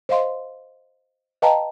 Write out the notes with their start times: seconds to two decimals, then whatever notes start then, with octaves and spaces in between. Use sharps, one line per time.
0.09 C5 D#5 F5 C6
1.42 B4 D#5 F5 G5 A5 A#5